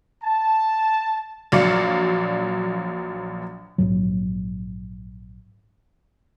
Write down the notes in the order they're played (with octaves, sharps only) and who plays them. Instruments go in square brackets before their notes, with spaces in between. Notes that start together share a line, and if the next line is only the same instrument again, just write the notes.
[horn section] A5
[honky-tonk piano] A#1 F#3 D5 F5 C#7
[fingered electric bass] A#1 D#2 G#2 F#3